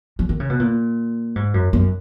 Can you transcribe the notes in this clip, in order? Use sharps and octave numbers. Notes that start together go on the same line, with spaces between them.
F3
D#3
C#3
B2
A#2
G#2
F#2
F#2